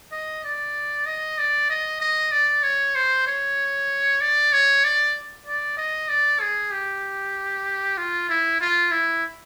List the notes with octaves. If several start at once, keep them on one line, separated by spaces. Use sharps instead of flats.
D#5
D5
D#5
D5
D#5
D#5
D5
C#5
C5
C#5
D5
C#5
D5
D5
D#5
D5
G#4
G4
F4
E4
F4
E4